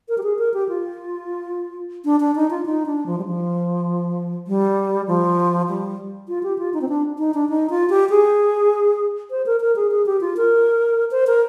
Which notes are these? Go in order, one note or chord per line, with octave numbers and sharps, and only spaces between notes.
A#4
G4
G#4
A#4
G4
F4
D4
D4
D#4
F4
D#4
D4
F3
G3
F3
G3
F3
G3
F4
G4
F4
D#4
C4
D4
D#4
D4
D#4
F4
G4
G#4
C5
A#4
A#4
G#4
G#4
G4
F4
A#4
C5
A#4